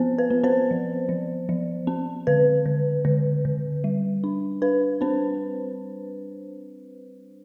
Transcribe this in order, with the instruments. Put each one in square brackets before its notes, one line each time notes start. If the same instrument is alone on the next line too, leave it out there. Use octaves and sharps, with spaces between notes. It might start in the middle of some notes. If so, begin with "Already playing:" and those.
Already playing: [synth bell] F3 B3 C4 C5
B4
B3
C4 C5
F3
F3
F3
C4
D3 B4
D3
D3
D3
G3
D4
D4 B4
C4 D4 C5